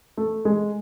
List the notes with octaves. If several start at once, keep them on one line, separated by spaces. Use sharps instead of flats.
A3
G#3